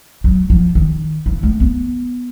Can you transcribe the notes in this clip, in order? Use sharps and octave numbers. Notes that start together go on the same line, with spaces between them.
F#3
F3
D#3
E3
A3
B3